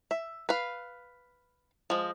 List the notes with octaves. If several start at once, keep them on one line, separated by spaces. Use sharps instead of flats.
E5
B4 F5
F3 G#3